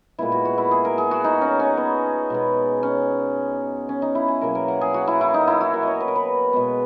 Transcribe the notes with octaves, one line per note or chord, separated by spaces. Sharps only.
A#2 G#3 B3 E4
F#4
F#4
E4
G#4
A#4
G#4
F#4
D#4
C#4
C#4
B3
B2 G#3 B3
C#4
C#4
D#4
E4
G#4
B2 F#3 A#3 A#4
A#4
F#5
G#4
F#4
E4
E4
D#4
E4
F#4
A#4
C#5 D#5
B4
A#4
B4
B2 G#3 B3